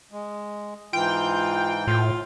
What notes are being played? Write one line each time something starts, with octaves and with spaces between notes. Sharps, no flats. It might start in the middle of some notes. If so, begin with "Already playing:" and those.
G#3
G#2 E3 F4 G5
A2 F4